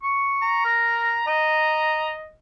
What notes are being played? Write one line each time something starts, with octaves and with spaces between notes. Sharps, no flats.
C#6
A#5
A#4
D#5 A#5